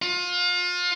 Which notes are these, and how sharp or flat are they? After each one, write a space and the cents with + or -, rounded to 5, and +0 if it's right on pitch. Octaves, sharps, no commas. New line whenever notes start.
F4 +30